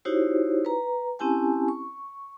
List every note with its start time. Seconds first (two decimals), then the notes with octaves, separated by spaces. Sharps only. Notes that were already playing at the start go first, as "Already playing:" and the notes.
0.05 D#4 E4 F#4 G4 C5 C#5
0.65 B4 A#5
1.19 C4 C#4 E4 G4 G#5 A5
1.68 C#6